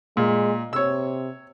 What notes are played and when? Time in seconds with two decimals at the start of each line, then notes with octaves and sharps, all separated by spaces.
0.17 A#2 G#3
0.73 C3 C#5 E6